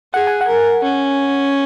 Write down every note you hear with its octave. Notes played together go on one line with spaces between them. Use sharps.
G#4 F#5
G#5
F#5
A#4
C#4